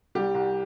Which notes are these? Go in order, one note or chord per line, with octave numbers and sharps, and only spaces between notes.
C2 G3 G4
C2